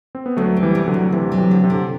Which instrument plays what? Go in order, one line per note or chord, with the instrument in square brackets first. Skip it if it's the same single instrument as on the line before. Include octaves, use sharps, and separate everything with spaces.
[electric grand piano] C4
B3
[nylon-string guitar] D2 [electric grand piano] F#3 A3
[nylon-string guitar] C4
[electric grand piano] E3 G3
[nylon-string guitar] C3
[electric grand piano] D3 F#3
[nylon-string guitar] D2
[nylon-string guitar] D2 [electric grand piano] C3 E3
[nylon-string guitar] F#3
[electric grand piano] C3 E3
[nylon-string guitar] D3
[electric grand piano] C3
[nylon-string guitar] D3